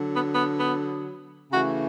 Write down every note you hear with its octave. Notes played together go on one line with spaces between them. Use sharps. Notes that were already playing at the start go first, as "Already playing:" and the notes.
Already playing: D3 F#3
B3
B3
B3
C#3 E3 A3 F#4